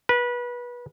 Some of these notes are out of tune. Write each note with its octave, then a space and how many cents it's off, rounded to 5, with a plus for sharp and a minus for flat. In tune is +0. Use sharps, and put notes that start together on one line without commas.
B4 -25